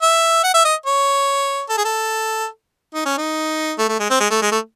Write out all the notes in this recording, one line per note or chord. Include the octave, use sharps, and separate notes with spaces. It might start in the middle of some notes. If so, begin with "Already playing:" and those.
E5
F#5
E5
D#5
C#5
A4
G#4
A4
D#4
C#4
D#4
A3
A3
G#3
C4
G#3
A3
G#3
A3